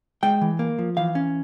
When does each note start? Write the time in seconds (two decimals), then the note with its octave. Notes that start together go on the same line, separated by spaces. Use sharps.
0.23 G#3 G5
0.41 E3
0.59 A#3
0.79 F3
0.97 E3 F5
1.15 C#4